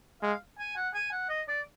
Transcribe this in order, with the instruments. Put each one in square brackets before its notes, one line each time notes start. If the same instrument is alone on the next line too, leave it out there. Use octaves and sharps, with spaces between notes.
[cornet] G#3 [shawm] F5
[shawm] G#5
F#5
G#5
F#5
D#5
D5